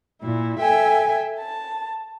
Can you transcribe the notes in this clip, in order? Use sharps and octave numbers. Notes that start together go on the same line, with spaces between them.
A#2 E4
A4 E5 G5 G#5
A5